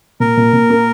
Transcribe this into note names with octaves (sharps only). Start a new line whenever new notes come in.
A#2 A#4
A#2
A#2
A#3